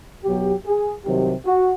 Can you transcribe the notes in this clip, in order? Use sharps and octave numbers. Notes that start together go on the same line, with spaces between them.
B1 B2 F#3 G4
G#4
C2 C3 D#3 F#3 G4
F#4